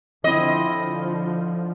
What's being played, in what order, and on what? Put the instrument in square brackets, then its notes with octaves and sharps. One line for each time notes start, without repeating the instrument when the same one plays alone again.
[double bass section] D3 F3 [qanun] C4 E4 [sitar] D#5